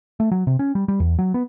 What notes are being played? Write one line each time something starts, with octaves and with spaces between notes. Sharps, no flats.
A3
F#3
C3
C#4
G3
G3
E2
F#3
B3